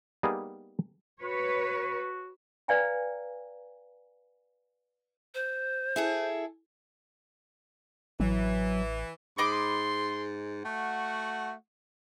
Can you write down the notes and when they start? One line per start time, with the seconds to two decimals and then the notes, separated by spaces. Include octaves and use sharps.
0.23 G3 A#3 B3 D#4 G4 G#4
1.22 F#4 B4 C#5
2.68 B4 D5 F5 G5 G#5 A#5
5.34 C5
5.96 E4 G#4 A4
8.20 A1 E3 F#3
9.38 G#2 D#5 B5 C6 D6
10.65 A3 F#4 F#5